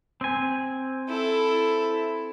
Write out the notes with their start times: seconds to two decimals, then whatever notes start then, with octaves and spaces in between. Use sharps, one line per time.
0.21 C4 G#5
1.09 E4 A4